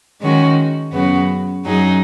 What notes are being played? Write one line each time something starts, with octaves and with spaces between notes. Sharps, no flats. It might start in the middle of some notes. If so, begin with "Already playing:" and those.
D#3 G#3 C#4 F#4
F#2 C#3 B3 F#4
F#2 F#3 D#4 G#4